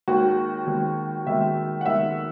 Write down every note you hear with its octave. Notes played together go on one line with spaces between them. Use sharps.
D#2 D#3 G#3 F#4
D#2 D#3 G#3
D#2 D#3 G#3 E5
F#5
D#2 D#3 G#3 E5